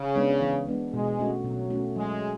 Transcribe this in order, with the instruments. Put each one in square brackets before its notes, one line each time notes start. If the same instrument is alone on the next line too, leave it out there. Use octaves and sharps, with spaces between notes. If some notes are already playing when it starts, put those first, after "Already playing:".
Already playing: [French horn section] C#3
[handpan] G#3 B3 D4
E3
G#3 B3 D4
[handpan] B2 [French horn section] G#3
[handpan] A3 C#4 F#4
[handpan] B2 [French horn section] F#3
[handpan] A3 C#4 F#4
[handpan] F#3 [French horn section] G#3